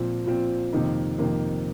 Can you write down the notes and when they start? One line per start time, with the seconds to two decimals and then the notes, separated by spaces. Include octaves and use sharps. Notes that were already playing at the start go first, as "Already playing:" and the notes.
Already playing: A#2 F3 C4
0.26 A#2 F3 C4
0.73 F2 C3 D#3 A#3 D#4
1.18 F2 C3 D#3 A#3 D#4